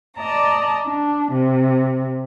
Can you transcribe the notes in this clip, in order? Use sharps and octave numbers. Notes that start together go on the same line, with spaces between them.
D5 D#5 A5 A#5
D4
C3